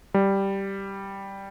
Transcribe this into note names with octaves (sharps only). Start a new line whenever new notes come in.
G3